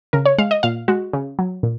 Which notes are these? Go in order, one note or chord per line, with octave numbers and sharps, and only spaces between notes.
C#3 A#4
C#5
G#3 F5
D#5
A#2 F5
G#3 F#4
C#3
F#3
A#2